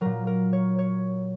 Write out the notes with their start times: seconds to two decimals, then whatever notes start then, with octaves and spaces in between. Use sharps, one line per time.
0.01 A#2 F#3 A#4
0.27 A#4
0.53 C#5
0.79 C#5